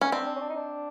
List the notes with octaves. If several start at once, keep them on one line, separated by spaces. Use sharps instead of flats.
C#4
C4 D4
D4
C#4
D4
D#4
D4